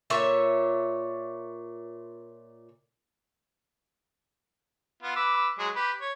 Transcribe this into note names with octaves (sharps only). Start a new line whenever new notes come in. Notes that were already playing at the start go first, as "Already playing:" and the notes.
A#2 C#5 E5
B3 F4
B4 D6 E6
F#3 G#3 G#4
G4 B4
C#5